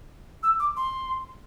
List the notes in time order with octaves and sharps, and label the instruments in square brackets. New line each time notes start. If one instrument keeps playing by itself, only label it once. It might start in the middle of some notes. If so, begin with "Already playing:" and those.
[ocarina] E6
D6
C6